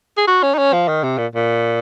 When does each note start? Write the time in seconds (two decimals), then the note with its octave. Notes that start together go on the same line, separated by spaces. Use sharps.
0.17 G#4
0.27 F#4
0.43 C#4
0.54 D#4
0.58 C#4
0.73 F3
0.88 D#3
1.03 C3
1.18 A#2
1.35 A#2